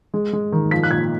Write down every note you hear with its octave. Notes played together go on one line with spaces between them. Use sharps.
G#3
G#3
D#3
F3 B6
F#6
A#2 G#6